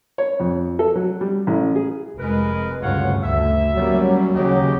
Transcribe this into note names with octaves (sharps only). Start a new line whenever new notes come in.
C#5
F2
A4
F#3
G3
A1
G#4
F1 G#3 A#4 B4
D2 G2 C#3 F4 C#5 F#5
D2 E5
F#3 G3 A#3 C#4
D#2 C#3 G4 D#5